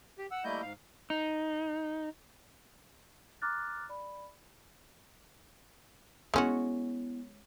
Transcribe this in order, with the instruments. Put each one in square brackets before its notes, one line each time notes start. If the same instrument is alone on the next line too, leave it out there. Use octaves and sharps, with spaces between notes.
[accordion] G4
F#5 E6
G3 A3 A#3 E4 D#5 G6
G#2 F5
[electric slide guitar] D#4
[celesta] A#5 D6 F6 F#6 A6
D5 B5
[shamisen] G#3 C#4 F#4 [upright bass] B3 E4